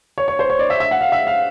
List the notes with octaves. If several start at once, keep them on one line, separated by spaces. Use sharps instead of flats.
C#5
C#5
C5
C#5
D5
E5
E5
F#5
F5
E5
F5